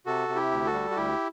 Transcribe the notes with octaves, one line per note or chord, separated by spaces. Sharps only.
C3 F#4 A4
C3
E4 G4
D2
F#4 A4
G3
F#4
D2 E4 G4